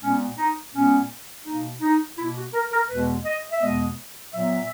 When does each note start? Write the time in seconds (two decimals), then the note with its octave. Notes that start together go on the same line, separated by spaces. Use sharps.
0.01 A#2 G#3 B3 C#4
0.37 D#4
0.73 A#2 G#3 B3 C#4
1.45 B2 A#3 D#4
1.81 D#4
2.17 B2 A#3 E4
2.35 F#4
2.53 A#4
2.71 A#4
2.89 E2 B2 G#3 B3 B4
3.25 D#5
3.51 E5
3.61 E2 B2 G#3 B3 D#5
4.33 A#2 F#3 B3 E5